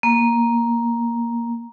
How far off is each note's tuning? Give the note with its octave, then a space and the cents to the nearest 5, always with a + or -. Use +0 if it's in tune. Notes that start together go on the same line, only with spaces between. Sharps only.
A#3 +10